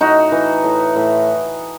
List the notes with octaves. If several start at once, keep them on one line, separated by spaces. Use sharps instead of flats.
A2 D#4 F#4
E3
A2
A2